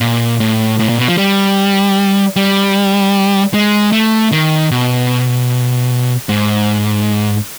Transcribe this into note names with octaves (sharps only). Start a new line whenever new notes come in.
A#2
A2
A2
A#2
B2
F3
G3
G3
G#3
A3
D#3
B2
G#2